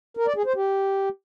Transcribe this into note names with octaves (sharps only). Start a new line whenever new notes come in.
A#4
D5
G#4
C5
G4